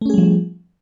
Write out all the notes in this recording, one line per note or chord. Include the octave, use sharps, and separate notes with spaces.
F3 G3 A3 C#4 G#4